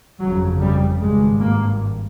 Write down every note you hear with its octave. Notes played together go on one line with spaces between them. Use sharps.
G1 F2 C#3 F#3
G3
G#1 G2 G#3
A#3